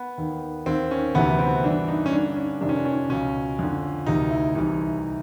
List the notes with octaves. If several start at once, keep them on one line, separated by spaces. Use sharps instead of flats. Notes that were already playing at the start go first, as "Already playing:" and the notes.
Already playing: B3
D#2 D#3
D#2 D#3 C4
C#4
D2 C3 E3 B3
C4
G2 E3 D4
D#4
C#4
G2 D3 D4
C#4
F2 C3 D#3 D4
C#4
D4
C#4
C#2 B2 C#4
F2 D3
D2 C3 D#3 D#4
E4
C2 C3 E3 D#4